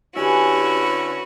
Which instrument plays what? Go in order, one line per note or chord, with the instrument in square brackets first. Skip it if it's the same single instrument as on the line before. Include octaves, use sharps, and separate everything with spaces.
[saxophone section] D3 C#4 E4 [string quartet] F#4 B4 [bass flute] G4 [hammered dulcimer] G#5